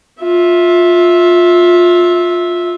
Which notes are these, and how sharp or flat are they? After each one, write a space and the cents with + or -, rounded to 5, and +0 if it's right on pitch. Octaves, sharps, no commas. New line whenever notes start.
F4 +15 E5 -10